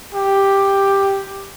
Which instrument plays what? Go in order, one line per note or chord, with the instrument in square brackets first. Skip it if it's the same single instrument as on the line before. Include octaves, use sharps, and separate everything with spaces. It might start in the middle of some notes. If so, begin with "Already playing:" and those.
[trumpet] G4